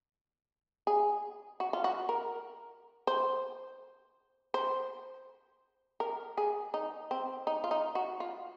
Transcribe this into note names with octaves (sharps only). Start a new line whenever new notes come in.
G#4
F#4
F4
F#4
A#4
C5
C5
A#4
G#4
D#4
C4
D#4
F4
D#4
F#4
F4